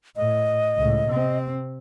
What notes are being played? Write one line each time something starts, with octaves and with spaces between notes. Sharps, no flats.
A2 D#5
C#2 A2
C3 C4